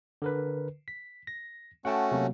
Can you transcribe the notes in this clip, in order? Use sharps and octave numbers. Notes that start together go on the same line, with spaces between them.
D3 A#4 B4
B6
A#6
A3 C#4 F#4 F#5 G5 A5
C3 F#3 A#3